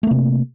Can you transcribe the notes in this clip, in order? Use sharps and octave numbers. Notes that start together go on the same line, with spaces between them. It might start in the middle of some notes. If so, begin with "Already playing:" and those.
C3 A3 A#3